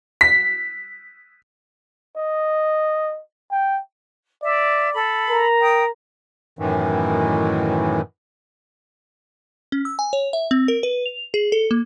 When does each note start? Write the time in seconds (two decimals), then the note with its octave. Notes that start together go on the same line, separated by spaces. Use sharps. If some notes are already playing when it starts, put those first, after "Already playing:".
0.21 B6
2.17 D#5
3.52 G5
4.42 D5 E5
4.94 A4 B5
5.29 A#4 A#5
5.60 G5 D#6
6.59 F#2 A2 D#3 E3
9.72 C#4
9.85 E6
9.99 G#5
10.13 C#5
10.33 E5
10.51 C4
10.68 A#4
10.83 B4
11.06 F7
11.34 G#4
11.52 A4
11.71 A#3